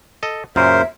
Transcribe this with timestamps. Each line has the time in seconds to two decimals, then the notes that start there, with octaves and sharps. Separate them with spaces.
0.23 A4 D#5
0.56 F#2 A#2 C#3 A#4 C5 E5